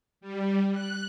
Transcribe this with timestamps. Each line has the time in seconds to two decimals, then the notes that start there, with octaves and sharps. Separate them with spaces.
0.21 G3
0.72 F#6